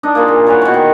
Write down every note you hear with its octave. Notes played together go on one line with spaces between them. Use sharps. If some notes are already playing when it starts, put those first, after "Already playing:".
D4 D#4 D#5
A#3 F4 G#4
A#2
E3 C#5 E5 F#5
B2 C#6
D#3